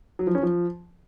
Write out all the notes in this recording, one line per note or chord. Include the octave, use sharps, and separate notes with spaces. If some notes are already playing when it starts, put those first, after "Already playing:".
F#3
F3
C#4
F3